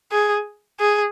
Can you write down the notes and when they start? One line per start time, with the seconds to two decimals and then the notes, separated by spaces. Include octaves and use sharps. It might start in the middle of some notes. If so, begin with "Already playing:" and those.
0.12 G#4
0.80 G#4